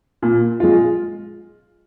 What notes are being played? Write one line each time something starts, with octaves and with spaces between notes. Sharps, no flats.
A#2
G#3 F4